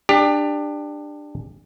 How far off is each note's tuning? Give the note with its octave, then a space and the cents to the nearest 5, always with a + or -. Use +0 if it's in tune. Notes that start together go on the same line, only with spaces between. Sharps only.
D4 +15 G4 +25